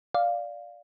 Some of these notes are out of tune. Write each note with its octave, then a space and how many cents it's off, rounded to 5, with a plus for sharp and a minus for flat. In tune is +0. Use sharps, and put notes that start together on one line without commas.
D5 +0 F5 +0